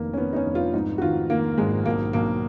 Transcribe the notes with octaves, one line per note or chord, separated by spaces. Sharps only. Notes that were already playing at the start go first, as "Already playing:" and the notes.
Already playing: F1 D#3 A#3
C#4
D#3 B3
D#4
C#4
F1
F4
G#2 D#4
F#4
D#3 F4
D#3 A#3
G#1 G#3
B1 A#3
B1 A#3